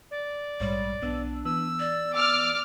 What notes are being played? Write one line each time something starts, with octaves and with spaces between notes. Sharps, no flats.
D5
A#1 G#2 G3 C#5
B1 B3 D4 E6
E3 B3 E6
D5
D6 E6 F6